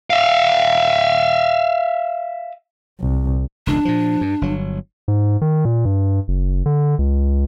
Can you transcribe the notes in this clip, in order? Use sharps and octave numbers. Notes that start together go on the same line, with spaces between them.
E5 F5
C2
E1 C#2 D4
A#2 F3
G2
G1 F#3
G#2
D#3
A#2
G2
F#1
D3
C#2